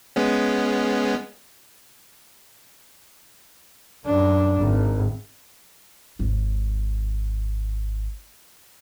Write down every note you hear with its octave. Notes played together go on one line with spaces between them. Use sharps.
G#3 B3 C#4
F#2 D4
G#1
G#1 D#2